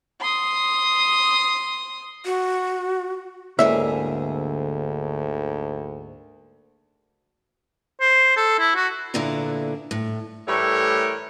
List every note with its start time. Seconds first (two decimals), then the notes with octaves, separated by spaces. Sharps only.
0.21 C6 D#6
2.25 F#4
3.59 D2 G#2 D3 A#3 C#4 E4 G#4 E5
8.01 C5
8.37 A4
8.59 E4
8.76 F#4
9.14 E2 A#2 D3 E4 D5 A#5
9.91 A2
10.48 A2 E3 G3 A3 A#4 C#5